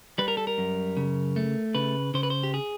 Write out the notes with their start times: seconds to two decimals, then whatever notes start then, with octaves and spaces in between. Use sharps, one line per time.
0.18 G3 B4
0.28 A#4
0.37 A4
0.47 A#4
0.58 F#2
0.97 C#3
1.36 A3
1.75 C#3 B4
2.14 C#3 C5
2.23 B4
2.30 C5
2.43 G4
2.54 G#4